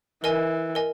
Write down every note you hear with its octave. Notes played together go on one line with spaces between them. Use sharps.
E3 A#4 D#5 G#5
A#4 D#5 G#5